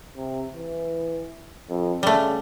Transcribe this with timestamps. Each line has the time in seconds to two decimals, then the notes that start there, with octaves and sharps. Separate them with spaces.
0.16 C3
0.53 E3
1.69 F2
2.03 C#3 G3 A3